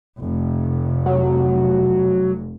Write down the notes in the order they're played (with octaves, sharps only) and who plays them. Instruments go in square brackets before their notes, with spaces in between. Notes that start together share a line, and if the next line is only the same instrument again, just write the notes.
[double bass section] F1
[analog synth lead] F#3